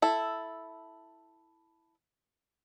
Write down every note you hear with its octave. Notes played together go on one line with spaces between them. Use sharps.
E4 A4